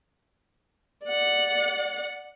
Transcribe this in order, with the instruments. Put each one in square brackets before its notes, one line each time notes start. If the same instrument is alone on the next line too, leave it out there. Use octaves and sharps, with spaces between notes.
[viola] D5 F#5